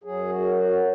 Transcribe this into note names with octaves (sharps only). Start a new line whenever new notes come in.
F#2 F#3 G#4
F#4
F#4